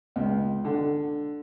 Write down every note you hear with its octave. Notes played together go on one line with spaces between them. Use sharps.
C#2
D3